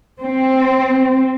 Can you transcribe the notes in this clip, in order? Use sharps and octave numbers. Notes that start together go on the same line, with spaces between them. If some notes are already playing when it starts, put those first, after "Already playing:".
C4